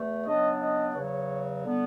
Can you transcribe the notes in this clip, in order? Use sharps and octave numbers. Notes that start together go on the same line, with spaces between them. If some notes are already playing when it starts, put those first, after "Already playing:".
Already playing: E2 A3
C#3 F#3 B3 D4 D#5
D#5
E2 C#3 F#3 C#5
D3 G3 B3